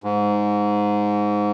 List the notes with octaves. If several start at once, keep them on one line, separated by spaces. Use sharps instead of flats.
G#2